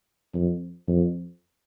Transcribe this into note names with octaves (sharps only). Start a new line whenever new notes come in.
F2
F2